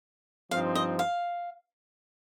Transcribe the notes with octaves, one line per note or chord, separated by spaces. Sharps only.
G2 F3 C4 D#4 F5
D#5
F5